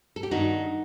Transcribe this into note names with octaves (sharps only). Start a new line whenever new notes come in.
A4
G4
G2 D#3 A3 D#4 F#4